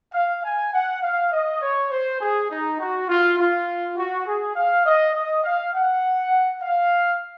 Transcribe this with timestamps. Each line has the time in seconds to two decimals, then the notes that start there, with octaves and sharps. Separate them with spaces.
0.14 F5
0.44 G#5
0.74 F#5
1.03 F5
1.32 D#5
1.62 C#5
1.91 C5
2.21 G#4
2.51 D#4
2.79 F#4
3.09 F4
3.39 F4
3.97 F#4
4.27 G#4
4.56 F5
4.85 D#5
5.15 D#5
5.44 F5
5.74 F#5
6.62 F5